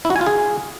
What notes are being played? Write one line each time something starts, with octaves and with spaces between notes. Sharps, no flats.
E4
F#4
G#5
F4
G#4